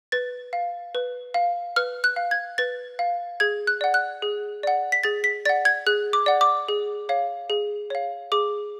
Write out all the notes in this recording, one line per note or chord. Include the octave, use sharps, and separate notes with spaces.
B4 A6
F5
B4
F5
B4 F6
F#6
F5
G#6
B4 A6
F5
G#4 G#6
F#6
D5 F#5
F#6
G#4
D5 F#5
B6
G#4 A6
B6
D5 F#5 A6
G#6
G#4 F#6
D6
D5 F#5
D6
G#4
C#5 F5
G#4
C#5 F5
G#4 D6